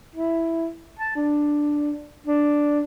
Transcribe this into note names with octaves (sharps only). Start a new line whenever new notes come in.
E4
A5
D4
D4